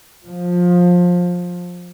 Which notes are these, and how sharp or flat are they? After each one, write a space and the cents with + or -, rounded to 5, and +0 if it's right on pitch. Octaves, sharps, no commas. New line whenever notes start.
F3 +20